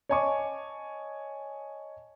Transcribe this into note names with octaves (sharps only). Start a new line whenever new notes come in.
C#5 D#5 G#5 A5 C#6 D6